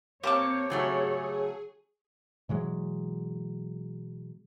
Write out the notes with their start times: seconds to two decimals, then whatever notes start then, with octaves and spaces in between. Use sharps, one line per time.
0.24 A#3 C4 G4 C#5 A5 D6
0.70 C#3 F#3 A3 G#4
2.49 B2 E3 F#3 G#3